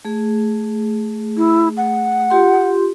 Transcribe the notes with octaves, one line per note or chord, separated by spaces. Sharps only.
A3 G#4
E4
F#5
F4 G4 C6